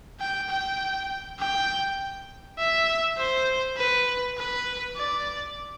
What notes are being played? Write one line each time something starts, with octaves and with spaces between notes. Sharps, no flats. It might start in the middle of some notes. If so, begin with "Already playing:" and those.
G5
G5
G5
E5
C5
B4
B4
D5